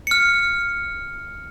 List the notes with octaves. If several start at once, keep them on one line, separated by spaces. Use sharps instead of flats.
F6 C#7